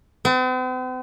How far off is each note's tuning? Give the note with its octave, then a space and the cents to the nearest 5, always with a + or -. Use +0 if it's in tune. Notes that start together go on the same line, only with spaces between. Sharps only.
C4 -45